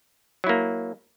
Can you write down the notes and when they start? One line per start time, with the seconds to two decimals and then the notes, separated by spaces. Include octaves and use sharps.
0.44 F#3
0.47 E4
0.49 A#3